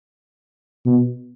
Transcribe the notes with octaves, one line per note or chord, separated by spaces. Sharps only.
B2